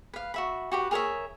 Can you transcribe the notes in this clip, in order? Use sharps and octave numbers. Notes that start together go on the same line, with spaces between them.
B4 F5
F#4 E5 B5
F#4 G4 B4
G#4 A#4 C#5 E5